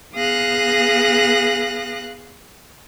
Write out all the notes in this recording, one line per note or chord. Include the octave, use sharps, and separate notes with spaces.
B3 G#4 F5 D#6 F#6 A#6